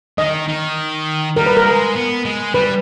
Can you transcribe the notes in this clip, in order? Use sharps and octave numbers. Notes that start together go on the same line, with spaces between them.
D#3 D#5
D#3
G3 A#4
B4
A#4
G#3
B3
G#3
G3 B4